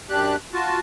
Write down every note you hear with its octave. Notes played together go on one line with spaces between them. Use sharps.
F#2 D4 G4 F#6
F4 F#4 A5